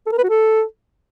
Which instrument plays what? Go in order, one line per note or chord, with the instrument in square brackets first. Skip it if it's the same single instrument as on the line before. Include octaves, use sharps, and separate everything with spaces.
[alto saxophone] A4
A#4
B4
F#4
A4